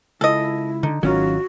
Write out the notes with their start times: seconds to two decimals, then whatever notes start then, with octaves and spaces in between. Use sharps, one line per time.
0.21 C#2 E4 A4 D#5
0.83 D3 D#4
1.03 G#1 D#3 F#3 C#4 F4 F#4